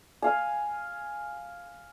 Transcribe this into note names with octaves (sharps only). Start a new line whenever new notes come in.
F5 G#5